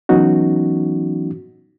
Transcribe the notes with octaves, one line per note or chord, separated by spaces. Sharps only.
E3 F#3 B3 C#4 D#4 F#4